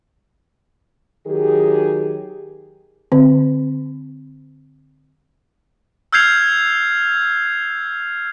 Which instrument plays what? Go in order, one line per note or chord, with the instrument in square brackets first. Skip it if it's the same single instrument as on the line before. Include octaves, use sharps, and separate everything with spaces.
[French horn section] D#3 F#3 G4 G#4
[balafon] D3 C4
[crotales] E6 F6 G6 G#6 C7 F7